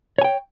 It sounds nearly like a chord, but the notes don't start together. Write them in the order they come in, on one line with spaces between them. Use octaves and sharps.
C#5 G#5 G5